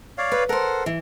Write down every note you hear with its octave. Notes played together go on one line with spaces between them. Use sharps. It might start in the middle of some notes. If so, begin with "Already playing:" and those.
C#5 D5 F5
B4
A4 A#4 C5 F#5
E3